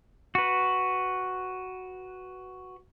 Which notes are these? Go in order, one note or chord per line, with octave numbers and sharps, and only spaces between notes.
F#4 B4